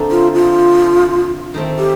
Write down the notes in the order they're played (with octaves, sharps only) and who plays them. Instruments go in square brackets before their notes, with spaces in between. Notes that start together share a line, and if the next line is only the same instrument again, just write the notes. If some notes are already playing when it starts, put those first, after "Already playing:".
Already playing: [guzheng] D3 A3 C4 D#4
[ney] F4
F4
[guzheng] D#3 A3 C4
[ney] G4